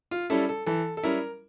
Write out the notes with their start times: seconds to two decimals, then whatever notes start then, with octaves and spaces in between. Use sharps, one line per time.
0.11 F4
0.30 G3 C#4 E4 A4
0.49 A4
0.66 E3 A4
0.97 A4
1.03 G3 C#4 E4 A#4